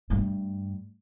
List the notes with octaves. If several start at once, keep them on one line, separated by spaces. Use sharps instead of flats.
G2 A3